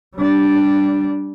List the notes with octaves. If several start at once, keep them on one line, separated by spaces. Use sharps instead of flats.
G3 D4